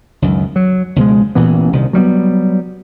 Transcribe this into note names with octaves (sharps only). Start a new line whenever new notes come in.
C#2 F#2 D#3
F#3
C#2 B2 F3 G#3
A1 A#2 E3 B3
C2 C3 D#3
F#3 G3 A3 B3